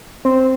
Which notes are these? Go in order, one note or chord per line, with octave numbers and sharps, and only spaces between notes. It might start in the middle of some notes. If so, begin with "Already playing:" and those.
C4